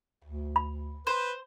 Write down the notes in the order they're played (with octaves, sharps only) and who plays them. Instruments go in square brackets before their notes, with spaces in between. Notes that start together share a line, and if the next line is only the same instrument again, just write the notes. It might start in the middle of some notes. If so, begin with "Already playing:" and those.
[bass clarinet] D2
[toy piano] B5
[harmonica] B4 [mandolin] C5